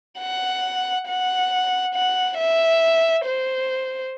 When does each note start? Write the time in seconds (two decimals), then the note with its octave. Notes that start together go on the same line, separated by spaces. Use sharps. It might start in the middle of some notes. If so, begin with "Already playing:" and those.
0.20 F#5
1.08 F#5
1.94 F#5
2.38 E5
3.25 C5